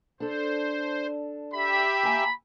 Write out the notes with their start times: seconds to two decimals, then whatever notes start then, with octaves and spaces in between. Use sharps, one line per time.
0.20 D4 A4 C5
1.54 G4 E5 B5
2.03 A#3 G#5 A#5